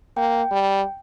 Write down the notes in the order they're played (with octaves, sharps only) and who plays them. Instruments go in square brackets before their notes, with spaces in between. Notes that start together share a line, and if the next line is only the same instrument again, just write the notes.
[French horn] A#3 [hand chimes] G5
[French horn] G3